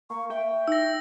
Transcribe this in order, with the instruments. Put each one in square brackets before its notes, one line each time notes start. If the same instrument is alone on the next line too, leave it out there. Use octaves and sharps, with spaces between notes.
[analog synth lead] A#3 [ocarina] C#6
[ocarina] E5 [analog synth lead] G5
[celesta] D#4 [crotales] E6 A#6